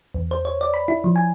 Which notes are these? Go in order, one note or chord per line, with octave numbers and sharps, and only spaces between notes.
E2
C5
C#5
D5
B5
E4
F3
G#5